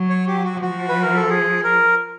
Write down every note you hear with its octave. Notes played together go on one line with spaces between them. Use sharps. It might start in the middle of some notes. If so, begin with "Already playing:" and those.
Already playing: F#3
C#5
G4
F#4
F3 F#4
B4
A#4
A4
G#4
A#4